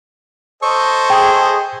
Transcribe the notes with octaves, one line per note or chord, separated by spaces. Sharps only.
A4 C5 D#5 C#6
G#4 G5